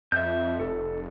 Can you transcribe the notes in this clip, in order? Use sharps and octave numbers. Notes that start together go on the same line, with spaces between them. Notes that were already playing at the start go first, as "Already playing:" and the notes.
F2 E5 G6
F1 A4